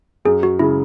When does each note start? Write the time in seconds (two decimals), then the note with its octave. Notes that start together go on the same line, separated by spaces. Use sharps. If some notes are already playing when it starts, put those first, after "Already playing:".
0.25 F#2 G#4
0.43 F#4
0.59 C#3 G#3 E4